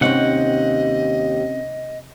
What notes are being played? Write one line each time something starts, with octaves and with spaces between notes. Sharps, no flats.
D#2 C3 C4 C#4 D#4 D#5 F#5